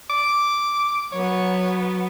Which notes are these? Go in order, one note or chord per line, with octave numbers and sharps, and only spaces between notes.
D6
F#3 B3 C#5